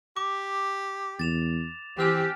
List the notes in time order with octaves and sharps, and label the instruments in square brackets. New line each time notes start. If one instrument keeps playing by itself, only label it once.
[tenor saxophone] G4 [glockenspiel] D6
[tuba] E2 [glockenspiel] A6 E7 F7
[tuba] E3 [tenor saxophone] C4 [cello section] G4 [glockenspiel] G#5 F6 F#6